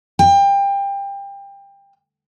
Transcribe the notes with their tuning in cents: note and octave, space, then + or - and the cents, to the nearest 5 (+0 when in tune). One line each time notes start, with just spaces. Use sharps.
G5 +25